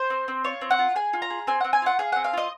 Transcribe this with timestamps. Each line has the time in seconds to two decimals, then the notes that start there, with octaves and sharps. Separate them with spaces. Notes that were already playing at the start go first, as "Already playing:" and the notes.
Already playing: C5
0.10 C4
0.28 C4
0.44 F4 C#5
0.61 C4
0.71 F#5
0.79 F4
0.96 G#4 G#5
1.13 F4
1.22 A#5
1.30 G#4
1.47 C4 G#5
1.61 C4 F#5
1.73 G#5
1.82 F4 F#5
1.99 G#4 F5
2.12 C4 F#5
2.24 F5
2.33 F4 D#5